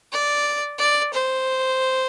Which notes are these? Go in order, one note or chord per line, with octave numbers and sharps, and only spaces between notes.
D5
D5
C5